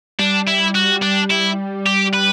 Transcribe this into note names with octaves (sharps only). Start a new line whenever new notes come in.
G3 D4
E4
F#4
D4
E4
G4
B4